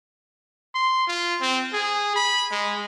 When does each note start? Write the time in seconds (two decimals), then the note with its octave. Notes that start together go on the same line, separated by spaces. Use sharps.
0.75 C6
1.07 F4
1.41 C4
1.73 G#4
2.16 B5
2.51 G#3